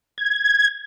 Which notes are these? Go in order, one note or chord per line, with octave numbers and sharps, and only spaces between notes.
G#6